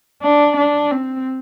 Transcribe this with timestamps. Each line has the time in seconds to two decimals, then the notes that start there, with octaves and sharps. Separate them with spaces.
0.23 D4
0.57 D4
0.91 C4